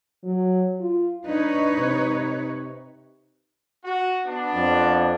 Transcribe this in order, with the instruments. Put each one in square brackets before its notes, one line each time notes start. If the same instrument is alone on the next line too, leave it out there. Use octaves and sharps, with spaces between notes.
[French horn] F#3
F4
[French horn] D4 [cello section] D#4 B4 C#5
[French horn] C3
[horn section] F#4
B3 D4
[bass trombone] F2